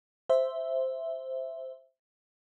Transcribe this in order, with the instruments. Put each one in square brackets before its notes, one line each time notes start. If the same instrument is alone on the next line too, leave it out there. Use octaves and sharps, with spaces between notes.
[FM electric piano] C5 E5